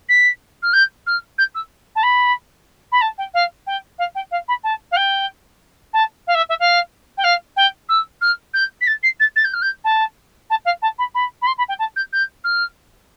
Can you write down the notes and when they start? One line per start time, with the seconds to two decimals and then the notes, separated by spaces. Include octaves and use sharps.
0.09 B6
0.62 F6
0.73 G6
1.07 F6
1.38 G6
1.55 E6
1.95 A5
2.03 B5
2.92 B5
3.01 A5
3.18 G5
3.34 F5
3.67 G5
3.98 F5
4.15 G5
4.31 F5
4.48 B5
4.64 A5
4.91 F5
4.96 G5
5.93 A5
6.27 F5
6.34 E5
6.49 E5
6.59 F5
7.17 G5
7.24 F5
7.56 G5
7.89 E6
8.21 F6
8.54 G6
8.81 B6
8.87 A6
9.03 C7
9.20 A6
9.36 A6
9.44 G6
9.54 F6
9.62 G6
9.84 A5
10.50 A5
10.65 F5
10.82 A5
10.98 B5
11.15 B5
11.42 B5
11.47 C6
11.58 B5
11.68 G5
11.79 A5
11.96 G6
12.13 G6
12.44 F6